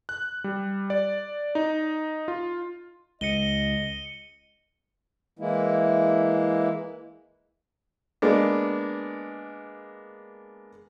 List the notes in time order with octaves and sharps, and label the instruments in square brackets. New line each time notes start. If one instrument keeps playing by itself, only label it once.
[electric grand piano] F#6
G3
D5
D#4
F4
[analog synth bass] C#2 [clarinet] D#5 [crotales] C#7 D#7 G7
[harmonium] E3 G#3 A#3 E4
[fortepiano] G#3 A#3 B3 D4